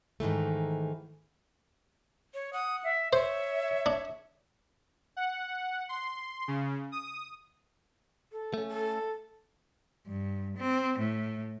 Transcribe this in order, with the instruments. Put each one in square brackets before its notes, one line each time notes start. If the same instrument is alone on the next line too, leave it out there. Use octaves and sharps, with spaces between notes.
[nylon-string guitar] G#2 D#3 E3 A3
[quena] C#5
[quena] F#5 [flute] D#6
[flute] E5
[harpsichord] C5 [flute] C#5 [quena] E5
[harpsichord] D4
[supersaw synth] F#5
C6
C#3
D#6
[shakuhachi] A4
[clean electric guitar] A3 C#4
[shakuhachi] A4
[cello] G2
C4
A2